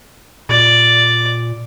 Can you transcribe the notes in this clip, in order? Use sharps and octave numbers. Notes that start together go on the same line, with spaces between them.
A#2 D5